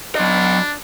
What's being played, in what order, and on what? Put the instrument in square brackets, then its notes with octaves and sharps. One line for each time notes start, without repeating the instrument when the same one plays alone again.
[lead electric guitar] F#3 D#5 [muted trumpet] D4